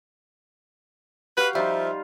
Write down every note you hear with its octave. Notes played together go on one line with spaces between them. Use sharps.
F#4 G4 B4 F5
F3 G3 D#4 F4 E5